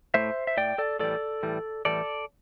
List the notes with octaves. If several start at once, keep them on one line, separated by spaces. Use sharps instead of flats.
A2 A3 C5 E5
E5
A2 A3 D5 G5
A4 D5
A2 E3 G3 A4 D5
A2 E3 G3
A2 E3 G3 A4 D5